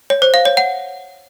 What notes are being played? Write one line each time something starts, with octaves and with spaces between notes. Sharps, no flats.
C#5
C5
F5
C#5
F#5